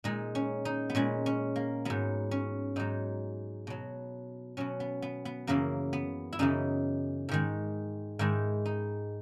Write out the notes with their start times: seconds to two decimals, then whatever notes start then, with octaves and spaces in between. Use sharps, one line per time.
0.04 A#2 G#3 D#4
0.35 C#4
0.65 D#4
0.90 B3
0.95 A#2 G#3 C#4
1.26 C#4
1.56 A#3
1.85 G#2 F#3 B3
2.31 C#4
2.76 G#2 F#3 D#4
3.67 B2 F#3
4.57 B2 F#3 C#4
4.80 B3
5.02 B3
5.25 B3
5.47 F#2 C#3 E3 A#3
5.93 B3
6.33 E4
6.39 F#2 C#3 E3 D#4
7.29 G#2 D#3 G#3
8.19 G#2 D#3 G#3 E4
8.66 D#4